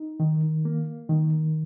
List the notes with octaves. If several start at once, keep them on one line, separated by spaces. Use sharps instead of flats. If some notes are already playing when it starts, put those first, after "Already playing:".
Already playing: D#4
D#3
A#3
D#3